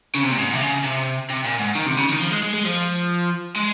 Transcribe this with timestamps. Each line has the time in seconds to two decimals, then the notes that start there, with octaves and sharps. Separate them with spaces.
0.15 C#3
0.23 C3
0.31 A#2
0.38 G#2
0.53 C3
0.61 C#3
0.84 C3
1.30 C3
1.44 A#2
1.59 G#2
1.75 D#3
1.86 C3
1.97 C#3
2.09 D#3
2.20 F3
2.31 G#3
2.43 G#3
2.54 G#3
2.65 F3
3.56 G#3